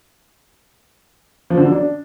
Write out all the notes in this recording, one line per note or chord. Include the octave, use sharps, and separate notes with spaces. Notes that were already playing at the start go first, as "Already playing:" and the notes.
F3
D3
F#3
D4